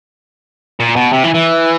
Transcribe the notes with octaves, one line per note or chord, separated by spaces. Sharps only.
A#2
B2
C3
E3
E3